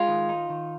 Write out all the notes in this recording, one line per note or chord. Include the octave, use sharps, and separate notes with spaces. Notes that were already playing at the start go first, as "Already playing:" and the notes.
Already playing: G#3 F4
D#3
D#4
D#3